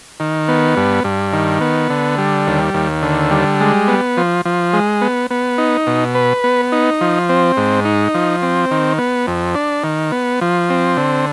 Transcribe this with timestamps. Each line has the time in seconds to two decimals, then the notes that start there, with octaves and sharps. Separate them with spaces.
0.20 D#3
0.48 B3
0.77 G2
1.04 G2
1.33 D#3
1.61 B3
1.90 D3
2.18 G3
2.47 D#2
2.74 D#2
3.02 D3
3.31 G3
3.60 G#3
3.88 B3
4.17 F3
4.45 F3
4.73 G#3
5.01 B3
5.31 B3
5.58 D#4
5.87 B2
6.15 B4
6.44 B3
6.72 D#4
7.01 F3
7.29 C4
7.57 G#2
7.85 D#4
8.14 F3
8.42 C4
8.71 D#3
8.98 B3
9.27 F2
9.55 D4
9.84 D#3
10.12 B3
10.41 F3
10.70 C4
10.97 D3